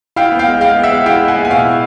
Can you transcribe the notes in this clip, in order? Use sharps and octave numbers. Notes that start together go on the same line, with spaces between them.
E4 F5 G5
B3
F5 G5
G#3
G#3 F5 G5
B3
E5 F#5
G#3
E4 F5 G5
G#3
F#5 G#5
B3
G#5
B2 F5 G5
E4